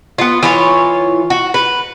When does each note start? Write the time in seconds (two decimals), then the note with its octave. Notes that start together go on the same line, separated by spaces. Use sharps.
0.18 B3 F4
0.43 E3 F4 C#5
1.30 F#4
1.54 B4